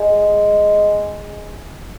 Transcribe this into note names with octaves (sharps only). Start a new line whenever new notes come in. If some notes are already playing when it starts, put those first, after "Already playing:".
Already playing: G#3